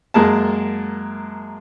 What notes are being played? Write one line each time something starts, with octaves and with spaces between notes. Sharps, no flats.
F#2 G#3 A#3 A5